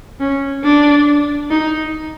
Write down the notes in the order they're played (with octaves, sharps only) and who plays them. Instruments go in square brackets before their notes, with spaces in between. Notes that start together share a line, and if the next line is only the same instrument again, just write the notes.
[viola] C#4
D4
D#4